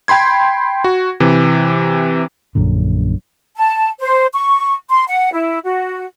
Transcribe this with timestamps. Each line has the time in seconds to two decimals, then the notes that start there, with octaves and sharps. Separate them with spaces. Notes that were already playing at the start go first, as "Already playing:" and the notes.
0.08 G5 B5 C6 G#6
0.84 F#4
1.20 C3 E3
2.55 A#1 F#2 A#2 D3
3.57 A5
4.01 C5
4.33 C#6
4.90 C6
5.08 F#5
5.33 E4
5.64 F#4